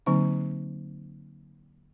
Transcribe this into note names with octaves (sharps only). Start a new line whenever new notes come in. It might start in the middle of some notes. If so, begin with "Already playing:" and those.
D3 F#3 A#3 C4 D#4